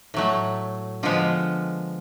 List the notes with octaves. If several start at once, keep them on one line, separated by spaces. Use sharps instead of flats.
A2 F#3 A3
D3 F3 G#3 B3 F4